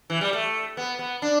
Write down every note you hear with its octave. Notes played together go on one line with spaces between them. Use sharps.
E3
G3
A3
B3
B3
D4